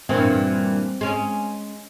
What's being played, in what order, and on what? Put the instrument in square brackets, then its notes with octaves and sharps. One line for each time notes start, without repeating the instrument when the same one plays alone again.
[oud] G2 A#2 E3 [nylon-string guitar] C4
[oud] G#3 C#4